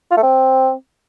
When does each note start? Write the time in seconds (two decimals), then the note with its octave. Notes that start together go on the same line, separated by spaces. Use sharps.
0.11 F4
0.17 A3
0.23 C4